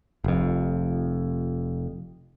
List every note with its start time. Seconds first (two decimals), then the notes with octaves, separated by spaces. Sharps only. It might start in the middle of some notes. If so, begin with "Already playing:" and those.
0.24 F1 F2